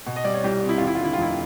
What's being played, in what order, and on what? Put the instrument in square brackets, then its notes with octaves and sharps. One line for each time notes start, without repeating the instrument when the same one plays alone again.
[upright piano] B2
D#5
G3 D5
C#5
C2 G4
C4
E4
D#2 F4
E4
F4
D3 E4
F4
F1 E4